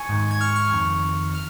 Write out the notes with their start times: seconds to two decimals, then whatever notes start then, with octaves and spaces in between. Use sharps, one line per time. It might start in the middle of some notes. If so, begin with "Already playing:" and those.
Already playing: G#5 C#6
0.09 G#2 D#3
0.31 G#6
0.41 C#6 F6
0.56 C#6 F6
0.72 F2 D#3
1.35 F6